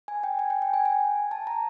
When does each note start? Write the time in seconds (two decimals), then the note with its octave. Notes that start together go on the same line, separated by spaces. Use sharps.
0.08 G#5
0.23 G5
0.39 G#5
0.50 G5
0.62 G5
0.74 G#5
0.85 G#5
1.31 A5
1.47 A#5